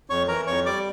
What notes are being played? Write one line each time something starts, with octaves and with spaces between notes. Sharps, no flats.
F2 C#5 C#6
E3 A#4 A#5
F2 C#5 C#6
G3 D5 D6